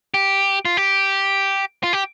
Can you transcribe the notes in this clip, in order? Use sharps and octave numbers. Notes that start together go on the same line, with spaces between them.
G4
F4
G4
F4
G4